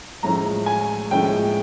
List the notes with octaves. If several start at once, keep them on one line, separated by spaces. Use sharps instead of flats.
A2 F3 G#3 C#4 A#5
G#5
A2 F3 G#3 C#4 G5